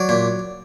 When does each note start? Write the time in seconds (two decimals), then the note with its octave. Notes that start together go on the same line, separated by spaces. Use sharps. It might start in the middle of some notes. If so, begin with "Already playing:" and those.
Already playing: F#3 D5
0.09 A#2